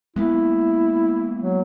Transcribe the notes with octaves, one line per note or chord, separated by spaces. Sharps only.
G#3 A#3 B3 E4
F#3